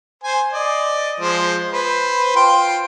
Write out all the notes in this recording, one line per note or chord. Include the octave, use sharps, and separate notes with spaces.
C5 G#5
D5 D#5
F3 G#3 C5
B4 C5
F4 G5 C6